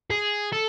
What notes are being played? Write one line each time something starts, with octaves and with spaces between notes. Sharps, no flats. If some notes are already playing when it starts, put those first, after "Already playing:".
G#4
A4